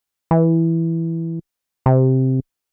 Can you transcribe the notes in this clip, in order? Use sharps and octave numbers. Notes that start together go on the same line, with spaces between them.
E3
C3